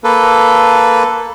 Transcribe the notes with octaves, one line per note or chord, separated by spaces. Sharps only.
A#3 A4 B4